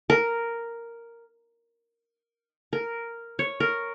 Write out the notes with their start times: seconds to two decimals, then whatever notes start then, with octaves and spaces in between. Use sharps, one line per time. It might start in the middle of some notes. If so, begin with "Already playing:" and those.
0.10 A#4
2.73 A#4
3.39 C#5
3.60 A#4